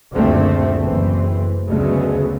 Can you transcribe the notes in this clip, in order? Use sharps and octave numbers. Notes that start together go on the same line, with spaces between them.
F#1 D2 A#2 D3 A3 C4
F#1 E3 A3 C4
D2 C#3 F#3 G#3 A3 B3